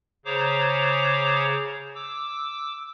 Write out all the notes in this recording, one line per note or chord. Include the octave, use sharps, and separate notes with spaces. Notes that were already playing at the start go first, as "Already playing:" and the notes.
C#3 G#4 C5 C#5 A#5 D6
D6 E6